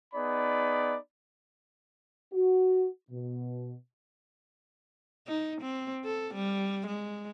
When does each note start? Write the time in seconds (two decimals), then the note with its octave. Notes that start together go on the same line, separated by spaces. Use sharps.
0.14 B3 D#4 G#4 D5 B5
2.33 F#4
3.11 B2
5.27 D#4
5.62 C4
6.05 A4
6.35 G3
6.87 G#3